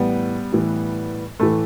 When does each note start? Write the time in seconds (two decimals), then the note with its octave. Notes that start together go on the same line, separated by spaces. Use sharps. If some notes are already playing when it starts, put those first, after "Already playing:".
Already playing: A2 E3 G3 B3
0.52 A2 E3
1.40 A2 E3 A3